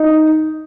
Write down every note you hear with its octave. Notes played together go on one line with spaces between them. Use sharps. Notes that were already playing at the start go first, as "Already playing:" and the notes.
Already playing: D#4